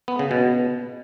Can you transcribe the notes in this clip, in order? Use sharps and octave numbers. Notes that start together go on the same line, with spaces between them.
B3
C#3
B2